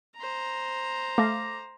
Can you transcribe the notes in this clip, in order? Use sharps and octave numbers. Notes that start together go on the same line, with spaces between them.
C5 A#5
A3 F5 D6 A#6